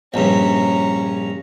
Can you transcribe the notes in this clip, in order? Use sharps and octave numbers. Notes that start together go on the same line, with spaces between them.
A#1 G2 C#4 A#5